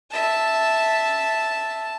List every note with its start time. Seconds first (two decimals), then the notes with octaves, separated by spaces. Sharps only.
0.13 E5 A5